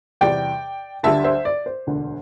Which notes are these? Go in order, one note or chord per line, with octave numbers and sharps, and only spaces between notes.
E2 C3 G3 D5 G5
D2 D3 G3 E5 A5
C5 E5
D5
C5
E1 D2 D3